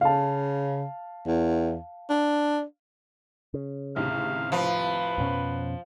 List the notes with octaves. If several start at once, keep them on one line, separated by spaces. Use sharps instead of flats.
C#3 F5 A5
E2
D4
C#3
D#2 A2 C3 F5
F3 B4
F2 B2 C#4